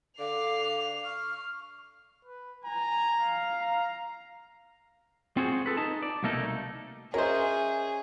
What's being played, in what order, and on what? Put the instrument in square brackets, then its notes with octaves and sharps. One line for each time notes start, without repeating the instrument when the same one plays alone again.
[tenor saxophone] D3 [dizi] F5 [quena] D6 [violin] C7 F7
[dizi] C#6 [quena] F6
[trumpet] B4
[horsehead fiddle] G#5 [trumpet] A#5
[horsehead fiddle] F5
[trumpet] A#5
[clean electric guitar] C4 F4 F#4 G#4 C5
G#4 A4 B4
D#4 A5
D5
C2 B2 A3 A#3 D#4 A4
[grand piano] C#4 [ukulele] F#4 D#5 E5 [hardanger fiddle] G#4 [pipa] A#4 C5